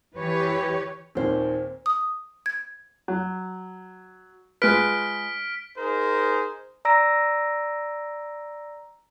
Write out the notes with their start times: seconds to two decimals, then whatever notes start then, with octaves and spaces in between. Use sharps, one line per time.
0.15 E3 G4 B4 C#5
1.15 D#2 A#2 D#3 C4 C5
1.86 D#6
2.46 G#6
3.08 F#3
4.62 G#3 F4 B4 F6 B6 D7
5.78 D#4 G#4 A#4 C5
6.85 D5 A#5 E6 A#6 D7